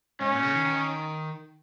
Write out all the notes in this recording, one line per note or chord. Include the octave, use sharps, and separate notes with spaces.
G#2 C#4
A#2
C#3
D#3
D#3